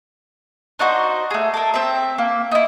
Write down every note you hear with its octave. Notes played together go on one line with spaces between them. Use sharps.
D4 D#4 F#4 C5
A3 G#4
A4 A#4
C4 E5
A#3
D#4 E4